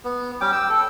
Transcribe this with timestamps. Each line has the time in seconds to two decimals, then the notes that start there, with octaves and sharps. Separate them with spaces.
0.04 B3
0.41 G3 C#4 G5 D6
0.52 G5 E6
0.70 A4